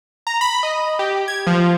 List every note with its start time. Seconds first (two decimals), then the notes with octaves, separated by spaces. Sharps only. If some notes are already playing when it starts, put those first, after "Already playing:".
0.27 A#5
0.41 B5
0.63 D#5
0.99 G4
1.28 G#6
1.47 F3